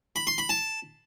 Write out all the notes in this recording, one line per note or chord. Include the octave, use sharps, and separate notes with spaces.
B5
C6
B5
A5